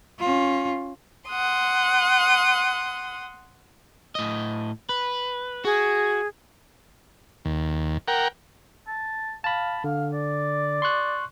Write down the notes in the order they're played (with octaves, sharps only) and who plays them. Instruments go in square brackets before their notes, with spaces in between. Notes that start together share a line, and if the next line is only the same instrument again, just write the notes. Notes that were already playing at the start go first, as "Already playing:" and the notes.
[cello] C#4 F4
[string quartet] F#5 C6 D#6
[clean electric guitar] A2 D#5
B4
[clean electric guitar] F#4 [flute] G#4
[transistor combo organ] D#2
A#4 F#5 G5
[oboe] A5
[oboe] F5 [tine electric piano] A5 B5
[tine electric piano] D3 [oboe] F5
[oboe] D5
[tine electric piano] C6 C#6 F#6